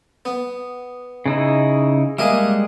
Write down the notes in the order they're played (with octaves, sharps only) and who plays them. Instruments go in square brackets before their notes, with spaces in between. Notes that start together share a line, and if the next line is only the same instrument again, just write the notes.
[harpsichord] B3
[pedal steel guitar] C#3 D#4 E4
[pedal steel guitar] G3 G#3 G#4 [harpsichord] A#3 D#5 E5